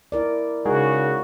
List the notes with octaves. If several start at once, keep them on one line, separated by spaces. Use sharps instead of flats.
E4 A#4 D5
C#3 G#3 D#4 F#4 G#4 A#4